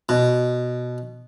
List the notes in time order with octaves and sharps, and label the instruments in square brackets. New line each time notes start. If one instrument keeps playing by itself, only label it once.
[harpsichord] B2